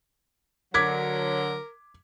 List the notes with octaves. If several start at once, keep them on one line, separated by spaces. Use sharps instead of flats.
D3 F#3 A#4 D6 G#6 B6